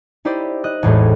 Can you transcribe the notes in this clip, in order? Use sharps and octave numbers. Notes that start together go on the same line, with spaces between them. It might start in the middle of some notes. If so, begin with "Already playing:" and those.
D#4 E4 G4 C5 D5 D#5
D#5 F#6
A1 E2 A2 G#3